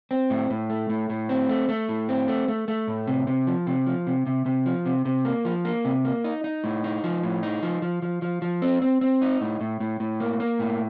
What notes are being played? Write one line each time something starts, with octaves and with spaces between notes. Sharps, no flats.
C4
A2
A2
A3
A2
A2
C4
A3
A3
A2
C4
A3
A3
A3
A2
C3
C3
F3
C3
F3
C3
C3
C3
F3
C3
C3
A#3
F3
A#3
C3
A#3
D#4
D#4
A2
D#4
F3
A2
D#4
F3
F3
F3
F3
F3
C4
C4
C4
D#4
A2
A2
A2
A2
A#3
A#3
A2